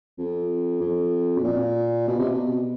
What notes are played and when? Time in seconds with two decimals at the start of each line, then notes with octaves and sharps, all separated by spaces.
0.18 F2
0.81 F2
1.37 B2
1.44 A#2
2.08 B2
2.19 C3
2.30 B2